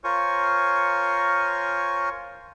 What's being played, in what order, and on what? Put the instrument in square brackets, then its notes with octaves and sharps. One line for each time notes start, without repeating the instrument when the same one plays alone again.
[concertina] F4 A#4 C5 C#5 G#5 C#6